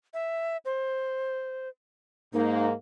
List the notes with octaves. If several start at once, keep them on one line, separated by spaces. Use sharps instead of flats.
E5
C5
G#2 A#3 D#4